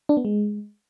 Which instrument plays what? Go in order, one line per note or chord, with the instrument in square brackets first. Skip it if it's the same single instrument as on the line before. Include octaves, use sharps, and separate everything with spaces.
[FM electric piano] D4
B3
G#3